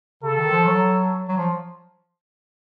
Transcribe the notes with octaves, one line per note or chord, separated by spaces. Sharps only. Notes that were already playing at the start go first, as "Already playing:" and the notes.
C#3 A4
D#3
F3
F#3
F#3
F3